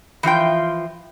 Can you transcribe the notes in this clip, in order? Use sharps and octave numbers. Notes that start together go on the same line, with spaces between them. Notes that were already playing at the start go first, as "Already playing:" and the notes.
E3 F3 F4 G5